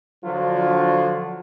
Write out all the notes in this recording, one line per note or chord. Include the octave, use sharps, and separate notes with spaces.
D3 F3 F#3 D4 F4 F#4